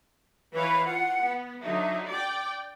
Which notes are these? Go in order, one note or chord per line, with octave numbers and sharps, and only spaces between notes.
E3 B4 C#5 F5
F4 F#5
B3
D3 F#3 D#4 E5
D5 G5 D6